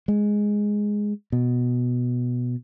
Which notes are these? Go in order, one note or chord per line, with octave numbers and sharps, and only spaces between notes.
G#3
B2